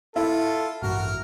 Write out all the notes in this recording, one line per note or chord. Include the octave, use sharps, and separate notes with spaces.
E4 F4 A4
A1 G2 F#4 A#4 F6